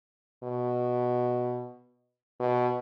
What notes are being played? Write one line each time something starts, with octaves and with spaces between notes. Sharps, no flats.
B2
B2